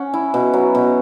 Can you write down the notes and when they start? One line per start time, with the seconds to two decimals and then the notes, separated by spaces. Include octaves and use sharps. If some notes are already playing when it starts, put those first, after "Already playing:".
Already playing: C#4 F#5
0.14 E4
0.34 B2
0.53 F#3
0.75 B2